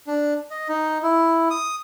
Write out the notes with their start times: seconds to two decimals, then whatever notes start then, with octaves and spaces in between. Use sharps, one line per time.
0.07 D4
0.51 D#5
0.69 D#4
1.03 E4
1.50 D#6